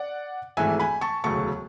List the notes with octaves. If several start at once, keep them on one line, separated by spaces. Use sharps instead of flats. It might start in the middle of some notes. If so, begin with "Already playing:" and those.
Already playing: D5 F#5
G#1 G#2 E3 A3 E5 G#5
G#5 B5
A5 C#6
E1 D2 C#3 F#3 A3 A5 C#6